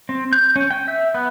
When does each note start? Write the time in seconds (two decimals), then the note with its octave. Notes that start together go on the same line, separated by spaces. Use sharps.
0.09 C4
0.33 G6
0.56 C#4
0.71 G5
0.88 E5
1.14 B3